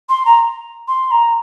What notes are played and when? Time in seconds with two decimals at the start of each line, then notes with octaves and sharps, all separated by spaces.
0.09 C6
0.25 A#5
0.88 C6
1.11 A#5